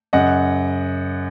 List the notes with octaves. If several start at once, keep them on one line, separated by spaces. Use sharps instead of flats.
F#2 C#3 D#5 F#5